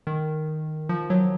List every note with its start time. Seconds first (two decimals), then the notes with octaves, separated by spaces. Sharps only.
0.07 D#3
0.89 F3
1.10 F#3